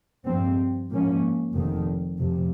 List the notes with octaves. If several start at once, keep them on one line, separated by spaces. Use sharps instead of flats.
G2 F3 C4
G#2 F3 A#3 C#4
F1 F2 D#3
F1 F2 C3